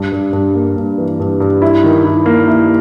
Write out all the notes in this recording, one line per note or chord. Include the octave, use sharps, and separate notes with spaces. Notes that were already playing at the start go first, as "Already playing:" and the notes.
Already playing: G2
G2
G2
A#3
G2
E3
G2
G2
E4
D#3
E4
A#3
E4